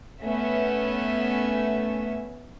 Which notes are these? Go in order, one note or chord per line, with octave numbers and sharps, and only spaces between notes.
A3 B3 C#4 E5